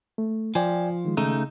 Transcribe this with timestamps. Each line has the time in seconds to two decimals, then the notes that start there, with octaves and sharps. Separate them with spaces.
0.18 A3
0.55 F3 D5 G5 G#5
1.05 D#3 G#3
1.17 C#3 A3 D#4